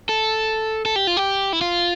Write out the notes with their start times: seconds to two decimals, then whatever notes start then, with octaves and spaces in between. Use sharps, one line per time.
0.09 A4
0.86 A4
0.96 G4
1.07 F4
1.17 G4
1.53 E4
1.61 F4